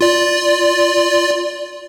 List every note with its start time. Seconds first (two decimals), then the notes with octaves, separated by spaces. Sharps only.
0.01 F4 D5